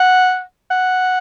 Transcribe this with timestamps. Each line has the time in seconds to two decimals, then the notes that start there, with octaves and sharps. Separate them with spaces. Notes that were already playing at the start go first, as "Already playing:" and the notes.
Already playing: F#5
0.71 F#5